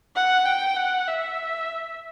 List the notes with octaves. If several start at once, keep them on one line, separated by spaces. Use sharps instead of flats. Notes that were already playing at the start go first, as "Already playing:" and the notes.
F#5
G5
F#5
E5